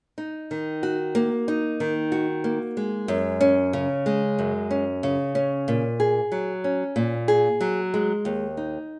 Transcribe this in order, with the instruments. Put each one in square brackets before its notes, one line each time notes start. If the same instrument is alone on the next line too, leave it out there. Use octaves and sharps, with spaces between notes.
[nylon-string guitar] D#4
D#3
F#4
A#3
D#4
D#3
F#4
A#3
G#3
F#2
C#4
C#3
G#3
F#2
C#4
C#3
C#4
A#2
G#4
F#3
C#4
A#2
G#4
F#3
G#3
D#2
D#4